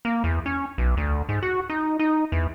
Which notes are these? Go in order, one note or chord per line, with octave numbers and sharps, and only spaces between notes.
A#3
E2
C#4
B1
D2
G#2
F#4
D#4
D#4
E2